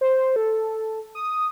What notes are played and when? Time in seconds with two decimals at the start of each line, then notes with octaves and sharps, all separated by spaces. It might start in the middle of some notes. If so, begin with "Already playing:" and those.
0.01 C5
0.36 A4
1.15 D#6